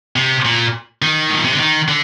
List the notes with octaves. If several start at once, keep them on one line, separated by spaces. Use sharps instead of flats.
C3
A#2
D#3
A2
A#2
C3
D3
D#3
D3